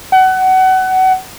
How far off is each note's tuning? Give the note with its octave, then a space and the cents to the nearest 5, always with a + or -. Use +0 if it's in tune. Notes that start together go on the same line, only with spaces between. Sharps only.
F#5 +25